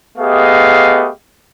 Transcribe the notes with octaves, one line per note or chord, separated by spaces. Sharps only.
A3 B3 G4 G#4 D#5 F5